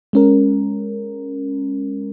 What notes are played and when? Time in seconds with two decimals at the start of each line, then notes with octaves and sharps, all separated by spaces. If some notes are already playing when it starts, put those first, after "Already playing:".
0.13 G#3 C#4 A#4